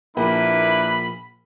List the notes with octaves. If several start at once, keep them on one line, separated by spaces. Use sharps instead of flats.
A#1 A#3 D4 E4 B4 B5